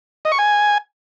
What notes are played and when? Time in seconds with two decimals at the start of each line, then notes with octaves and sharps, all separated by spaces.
0.25 D#5
0.32 C#6
0.39 G#5